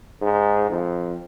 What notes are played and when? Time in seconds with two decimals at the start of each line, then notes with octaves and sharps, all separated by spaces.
0.22 G#2
0.70 F2